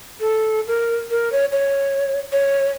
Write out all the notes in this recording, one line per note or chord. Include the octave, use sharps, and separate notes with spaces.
A4
A#4
A#4
C#5
C#5
C#5